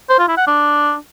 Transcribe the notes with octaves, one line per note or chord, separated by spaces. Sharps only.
C5
F4
E4
F#5
D4